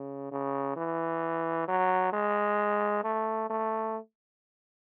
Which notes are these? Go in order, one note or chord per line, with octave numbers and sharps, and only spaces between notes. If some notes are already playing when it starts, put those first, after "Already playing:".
Already playing: C#3
C#3
E3
F#3
G#3
A3
A3